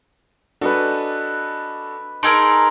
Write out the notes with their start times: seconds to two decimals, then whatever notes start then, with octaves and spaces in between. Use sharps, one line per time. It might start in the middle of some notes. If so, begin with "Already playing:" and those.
0.61 D4 F#4 A4 B4 D#5 G#5
2.23 D#4 G#4 A#4 A5 C6 E6 D7